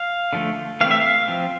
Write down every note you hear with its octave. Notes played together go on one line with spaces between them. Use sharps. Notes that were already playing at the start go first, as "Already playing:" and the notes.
Already playing: F5
D3 F3 A3
E3 A3 C4 F5
E5
F5
F3 C4